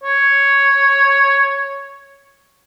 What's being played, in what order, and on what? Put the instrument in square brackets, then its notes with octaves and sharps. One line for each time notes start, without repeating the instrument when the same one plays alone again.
[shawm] C#5